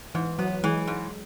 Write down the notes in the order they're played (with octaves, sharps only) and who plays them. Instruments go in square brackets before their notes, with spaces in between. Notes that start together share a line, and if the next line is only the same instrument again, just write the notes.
[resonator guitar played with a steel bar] G#2 [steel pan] E3
[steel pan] F#3 [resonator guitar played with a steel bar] B3
[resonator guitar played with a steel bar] E3 [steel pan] G#3
[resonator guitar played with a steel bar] G#2